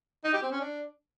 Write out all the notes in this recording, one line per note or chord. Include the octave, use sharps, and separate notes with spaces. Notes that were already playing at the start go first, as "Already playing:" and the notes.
D#4
G4
C4
C#4
D4